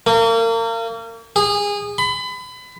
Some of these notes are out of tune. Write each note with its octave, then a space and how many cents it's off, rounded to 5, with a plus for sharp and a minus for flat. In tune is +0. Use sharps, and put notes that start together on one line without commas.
A#3 -35
G#4 -25
B5 +30